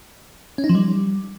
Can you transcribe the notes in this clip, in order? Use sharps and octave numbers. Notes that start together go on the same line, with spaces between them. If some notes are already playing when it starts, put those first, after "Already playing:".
C#4
D#4
F3
G3